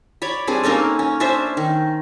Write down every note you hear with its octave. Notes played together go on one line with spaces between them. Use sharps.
C#5 D5 B5
G3 C4 D4 G#4
A#3 C#4 D#4 A4
C#4
C#4 D4 C5 E5
D#3